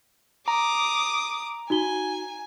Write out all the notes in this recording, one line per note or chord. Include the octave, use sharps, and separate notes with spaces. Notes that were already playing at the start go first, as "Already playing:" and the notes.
A#5 D6 D#6
D#4 F#4 G#5 G7